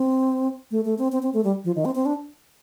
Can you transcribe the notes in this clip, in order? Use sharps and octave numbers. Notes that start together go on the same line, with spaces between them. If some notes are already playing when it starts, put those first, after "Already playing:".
Already playing: C4
A3
A3
C4
C4
C4
A3
G3
F3
D#3
C4
C4
D4